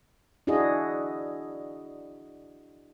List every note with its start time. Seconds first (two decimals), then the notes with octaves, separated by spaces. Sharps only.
0.47 D4 E4 F#4 G#4 D#5